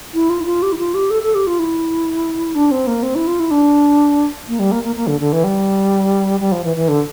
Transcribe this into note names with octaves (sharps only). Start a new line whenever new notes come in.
E4
F4
E4
F4
G4
E4
F4
G4
A4
A4
G4
F4
E4
D4
C4
A#3
C4
E4
F4
E4
D4
A#3
G3
A#3
A#3
A#3
D3
D3
E3
G3
G3
F3
E3
E3
D3